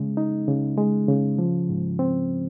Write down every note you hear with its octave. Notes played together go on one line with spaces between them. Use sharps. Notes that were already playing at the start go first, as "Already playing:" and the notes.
Already playing: C#3 G#3
D#4
C#3
G#3
C#3
F3
G#2
C4